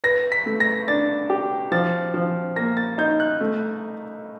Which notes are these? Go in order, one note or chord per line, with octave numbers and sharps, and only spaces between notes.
B4 A#6
B6
A3
A#6
D4 A6
G4
F3 A6
F3
A#3 A#6
A6
D#4 G6
F#6
A3